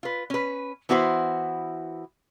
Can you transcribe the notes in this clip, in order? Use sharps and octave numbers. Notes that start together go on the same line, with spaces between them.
F4 B4
C#4 B4
E3 B3 E4 F#4 A#4 C5